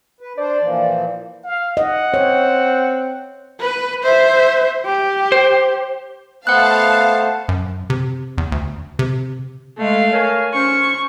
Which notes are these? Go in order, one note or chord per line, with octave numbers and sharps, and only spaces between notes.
B4
D4 C5 D5
A#2 E3 F3
F5
D#5 F#5
C4 C#5
B4
C5 E5
G4
C5
A3 B3 C5 F5 F#5 A5 F#6
F#2
C3
E2
D2
C3
G#3 A3 F5
A#4 C#5 G#5
C#4 C5 C#6